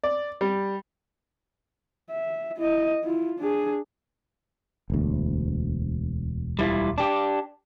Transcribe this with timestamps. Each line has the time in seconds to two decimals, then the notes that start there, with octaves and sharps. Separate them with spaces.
0.04 D5
0.41 G3
2.11 E5
2.57 E4 D#5
3.03 E4 F4
3.39 D4 G#4
4.90 E1 D2
6.59 G3 E4 F4
6.98 D4 G4